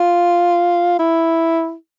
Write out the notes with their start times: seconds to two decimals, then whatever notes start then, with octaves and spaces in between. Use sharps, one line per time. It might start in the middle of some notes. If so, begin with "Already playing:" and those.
Already playing: F4
0.99 E4